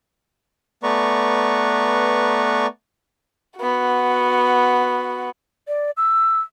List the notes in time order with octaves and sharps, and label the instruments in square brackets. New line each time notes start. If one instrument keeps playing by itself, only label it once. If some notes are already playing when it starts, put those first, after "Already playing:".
[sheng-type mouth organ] A3 B3 B4 D5 A#5 C#6
[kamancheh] B3 F#4
[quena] D5
E6